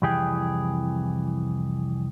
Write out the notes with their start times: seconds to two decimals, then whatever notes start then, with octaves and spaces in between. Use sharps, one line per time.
0.02 C2 F2 E3 G4 G#4 G5